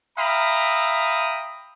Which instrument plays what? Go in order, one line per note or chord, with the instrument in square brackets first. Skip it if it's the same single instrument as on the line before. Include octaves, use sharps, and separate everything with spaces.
[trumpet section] E5 F5 G5 A#5 B5 D#6